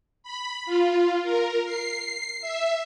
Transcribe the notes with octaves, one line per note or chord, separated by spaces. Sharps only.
B5
F4
A#4
C7
E5